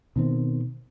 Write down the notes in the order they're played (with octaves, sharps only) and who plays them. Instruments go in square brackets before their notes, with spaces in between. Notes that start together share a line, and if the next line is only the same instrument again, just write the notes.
[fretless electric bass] B2 D#3 C4